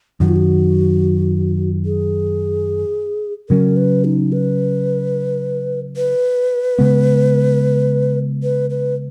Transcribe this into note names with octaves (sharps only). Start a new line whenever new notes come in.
F#2 D#3 F#3 F#4
F4
F#4
G#4
C#3 F#3 C#4 A#4
B4
D#4
B4
B4
C#3 G#3 B3
B4
B4